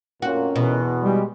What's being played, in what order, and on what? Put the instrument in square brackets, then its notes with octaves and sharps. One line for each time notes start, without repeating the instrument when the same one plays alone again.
[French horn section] F2 C#4 A#4 [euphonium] A#2 [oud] F#4
[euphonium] E2 [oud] B2
[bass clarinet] G3 [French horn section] G#3 G4